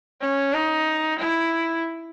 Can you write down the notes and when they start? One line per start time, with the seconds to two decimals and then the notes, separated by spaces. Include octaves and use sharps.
0.21 C#4
0.53 D#4
1.19 E4